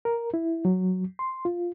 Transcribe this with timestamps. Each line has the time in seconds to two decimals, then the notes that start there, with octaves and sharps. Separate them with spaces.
0.05 A#4
0.34 E4
0.65 F#3
1.19 C6
1.45 F4